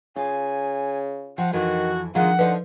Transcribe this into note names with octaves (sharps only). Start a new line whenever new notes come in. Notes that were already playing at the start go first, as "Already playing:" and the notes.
C#3 F4 G#5
F3 F#5 G5
F2 D#3 E3 F#4
D3 D#3 F3 G#3 F4 F#5
D3 F3 D#4 F4 B4